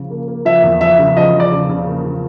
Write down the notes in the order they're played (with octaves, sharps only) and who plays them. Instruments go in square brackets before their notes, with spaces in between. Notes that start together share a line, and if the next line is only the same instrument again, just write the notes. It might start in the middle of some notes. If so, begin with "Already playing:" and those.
Already playing: [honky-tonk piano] C#3 F3
A#3
A#3
[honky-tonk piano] F3 [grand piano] E5
[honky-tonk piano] E2
[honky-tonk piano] F3 [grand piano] E5
[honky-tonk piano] C#3
[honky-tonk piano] F3 [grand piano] D#5
[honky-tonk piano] F3
[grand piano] D5
[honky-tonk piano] C#3
C#3
A#3
C#3